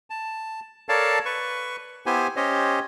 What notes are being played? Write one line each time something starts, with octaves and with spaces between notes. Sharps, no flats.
A5
A4 A#4 C#5 D5 F5 A5
B4 C#6
B3 E4 G4 C5 G#5
C#4 G4 C5 C#5 D#5